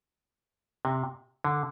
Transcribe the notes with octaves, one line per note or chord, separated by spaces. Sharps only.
C3
D3